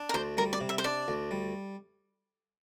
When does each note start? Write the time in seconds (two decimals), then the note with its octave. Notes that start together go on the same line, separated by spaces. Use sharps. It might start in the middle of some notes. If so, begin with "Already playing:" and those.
Already playing: D4
0.09 A#4
0.14 D2 C5
0.37 G3 A#4
0.53 D5
0.61 C3
0.69 E5
0.78 C5
0.84 D4 D5
1.08 D2
1.31 G3